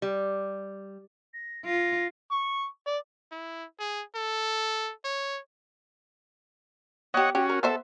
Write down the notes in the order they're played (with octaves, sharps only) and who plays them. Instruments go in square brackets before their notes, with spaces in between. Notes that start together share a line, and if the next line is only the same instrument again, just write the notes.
[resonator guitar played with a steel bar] G3
[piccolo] A#6
[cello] F4 [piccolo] A#6
[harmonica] C#6
D5
[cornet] E4
G#4
A4
C#5
[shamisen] B3 G4 [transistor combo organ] C#5 D#5 F#5
[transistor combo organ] C#4 F#4 [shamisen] G4
[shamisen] A#4
[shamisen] B3 C5 E5 [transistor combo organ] A4